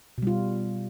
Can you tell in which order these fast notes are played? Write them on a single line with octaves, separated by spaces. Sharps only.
B2 G3 F4